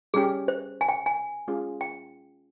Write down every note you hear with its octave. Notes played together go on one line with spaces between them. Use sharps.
G3 C#4 G4 G#4
C5
G#5
G5
G#5
G#3 C#4 F4 G#4
G5